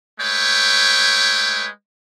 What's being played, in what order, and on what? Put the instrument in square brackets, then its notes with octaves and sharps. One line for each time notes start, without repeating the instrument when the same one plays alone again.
[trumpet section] G#3 A3 B4 C#5 G5